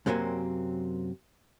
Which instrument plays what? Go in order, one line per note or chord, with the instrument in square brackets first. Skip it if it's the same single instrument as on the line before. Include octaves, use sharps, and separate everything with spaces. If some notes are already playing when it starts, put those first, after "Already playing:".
[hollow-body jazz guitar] F#2 C3 F#3 A#3 C4 G#5